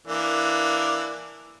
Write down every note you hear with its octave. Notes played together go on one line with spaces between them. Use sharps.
E3 A#3 D4